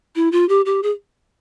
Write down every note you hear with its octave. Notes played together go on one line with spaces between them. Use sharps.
E4
F4
G4
G4
G#4